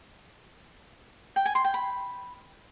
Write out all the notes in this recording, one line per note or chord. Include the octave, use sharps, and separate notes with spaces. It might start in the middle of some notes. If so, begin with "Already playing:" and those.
G5
G#5
C6
G5
B5